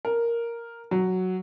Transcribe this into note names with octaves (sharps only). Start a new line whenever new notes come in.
A#4
F#3